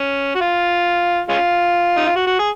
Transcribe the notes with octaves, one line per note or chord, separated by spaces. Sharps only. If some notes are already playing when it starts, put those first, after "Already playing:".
Already playing: C#4
F#4
F4
G#3 C#4 F4
D#4
F4
F#4
F#4
G#4